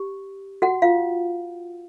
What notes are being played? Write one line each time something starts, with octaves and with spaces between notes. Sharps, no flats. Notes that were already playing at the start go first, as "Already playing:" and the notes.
Already playing: G4
F#4 F#5
F4 F5